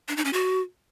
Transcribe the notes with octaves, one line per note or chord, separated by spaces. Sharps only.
D4
D#4
C#4
F#4